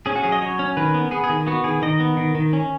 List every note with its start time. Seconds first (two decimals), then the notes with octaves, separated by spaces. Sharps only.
0.06 C#4 G#4
0.16 F#4
0.23 F#3 G#4
0.32 D#5
0.42 F#3 C#5
0.59 C#4
0.77 D#3 B4
0.94 B3
1.11 B3 G#4
1.24 G#4
1.29 D#3
1.47 B3 F#4
1.64 D#3 G#4
1.82 D#3 D#5
2.00 B3
2.17 D#3
2.35 D#3
2.53 C#4